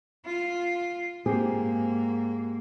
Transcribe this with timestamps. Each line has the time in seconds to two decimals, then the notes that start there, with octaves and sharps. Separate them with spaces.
0.25 F4
1.26 G#2 A#3 C4 G4 G#4